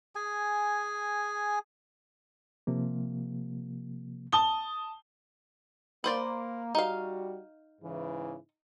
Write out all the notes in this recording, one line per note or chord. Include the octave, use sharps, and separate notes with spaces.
G#4 G#5
C3 F3 A#3
A5 D#6 G7
A#3 B4 C5 D5
G3 D#4 F#4 F5
G#2 C#3 E3